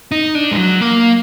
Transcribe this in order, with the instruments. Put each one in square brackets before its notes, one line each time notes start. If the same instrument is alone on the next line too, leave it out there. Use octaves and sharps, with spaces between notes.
[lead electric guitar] D#4
D4
G#3
F#3
A#3